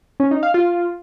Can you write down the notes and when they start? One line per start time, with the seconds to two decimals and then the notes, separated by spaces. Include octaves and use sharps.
0.20 C#4
0.31 D#4
0.43 F5
0.54 F4